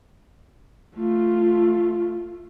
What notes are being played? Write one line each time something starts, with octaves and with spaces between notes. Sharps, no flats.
A3 F4